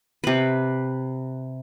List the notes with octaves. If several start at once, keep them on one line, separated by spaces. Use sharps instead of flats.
C3 B4